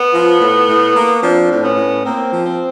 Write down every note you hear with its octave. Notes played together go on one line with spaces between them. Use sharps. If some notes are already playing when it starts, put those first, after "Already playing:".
Already playing: B3
F3
A2
A2
A#3
F3 C4 D4
A2
B3 C#4
A2
A#3 C4
F3
C4